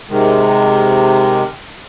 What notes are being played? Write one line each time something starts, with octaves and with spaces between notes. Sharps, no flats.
C3 D#3 G#3